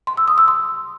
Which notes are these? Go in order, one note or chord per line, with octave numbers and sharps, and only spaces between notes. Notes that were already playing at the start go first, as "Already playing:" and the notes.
C6
E6
D#6
E6
C6